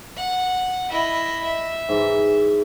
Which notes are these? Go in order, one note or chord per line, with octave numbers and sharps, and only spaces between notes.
F#5
E4 D#5
E5
G#2 E3